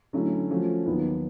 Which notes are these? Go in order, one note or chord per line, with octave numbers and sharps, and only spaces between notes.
D3 F#3 A3 C#4 E4
F3 A3 C#4 F#4
D#2 D#3 F#3 B3